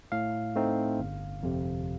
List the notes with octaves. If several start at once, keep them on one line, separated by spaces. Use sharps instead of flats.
A2 F5
A3 C4 D#4
G1
F2 C3